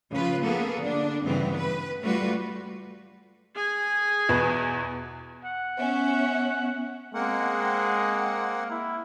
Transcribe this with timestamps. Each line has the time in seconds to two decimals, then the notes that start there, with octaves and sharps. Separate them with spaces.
0.12 C#3 F3 F4 B4
0.41 F3 A#3 B3 G#4 A4
0.79 D3 D4
1.24 G2 C#3 E3 B3 C4
1.55 B4
2.02 G3 A3 F4 F#4 B4
3.55 G#4 G#5
4.29 E2 B2 B4
5.45 F#5
5.79 B3 C#4 E5
7.14 G#3 A#3 C4 F#5
8.71 E4